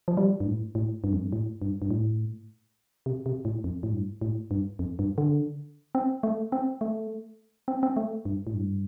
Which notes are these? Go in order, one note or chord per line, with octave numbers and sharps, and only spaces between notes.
F3
G3
G2
A2
A2
G2
F2
G2
A2
G2
G2
A2
C3
C3
A2
F2
A2
G2
A2
G2
F2
G2
D3
C4
A3
C4
A3
C4
C4
A3
G2
A2
G2